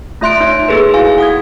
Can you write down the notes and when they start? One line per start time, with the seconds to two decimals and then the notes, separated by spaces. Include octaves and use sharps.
0.21 A3 F4 E5 C6 F#6 D7
0.40 D#4 F4 C#5 E5
0.68 A#3 G#4 A4 B4
0.94 E4 F#4 F5 G#5
1.18 F#5 D#6 G#6